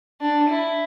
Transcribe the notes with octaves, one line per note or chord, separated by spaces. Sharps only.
D4
E4